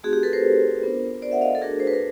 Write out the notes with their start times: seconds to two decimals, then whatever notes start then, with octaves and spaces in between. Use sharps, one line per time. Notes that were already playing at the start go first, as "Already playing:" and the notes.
0.03 A3 C4 D#4 F#4 G#4
0.13 G4
0.23 A4 B4
0.33 A#4 C5
0.83 B3 D4 F4
1.22 C5 D5
1.32 E5 F#5
1.41 D#5 F5
1.55 A4
1.61 A3 D4 F#4 G#4 A#4
1.80 C5
1.87 B4
1.93 A#4